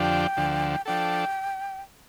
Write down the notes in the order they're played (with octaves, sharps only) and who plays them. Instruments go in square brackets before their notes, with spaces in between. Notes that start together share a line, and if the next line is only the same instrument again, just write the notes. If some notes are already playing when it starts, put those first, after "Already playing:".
Already playing: [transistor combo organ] F2 D3 F3 D4 G4 [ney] G5
[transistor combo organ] D2 D3 F3
[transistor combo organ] F3 D4 A4 [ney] G5